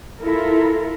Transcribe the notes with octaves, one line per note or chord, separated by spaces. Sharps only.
E4 F4 A4 A#4